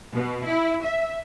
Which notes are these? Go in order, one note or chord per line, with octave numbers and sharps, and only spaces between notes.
B2
E4
E5